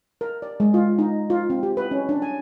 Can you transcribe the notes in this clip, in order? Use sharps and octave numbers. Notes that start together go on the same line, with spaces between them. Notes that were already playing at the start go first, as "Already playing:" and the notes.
A#4
D5
G#3
F4
D#4
F4
C4
G4
B4
C#4
D4
G#5